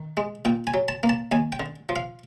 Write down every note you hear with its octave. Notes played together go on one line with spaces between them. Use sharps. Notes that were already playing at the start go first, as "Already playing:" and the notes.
Already playing: D#3
G#3
A#2 G5
G#5
F#3
A5
A#3
A5
D#2 G#5
G5
D3
F3
F5